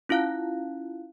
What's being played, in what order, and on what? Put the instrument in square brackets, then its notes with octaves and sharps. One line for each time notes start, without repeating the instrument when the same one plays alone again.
[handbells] C#4 E4 F4 F5 F#6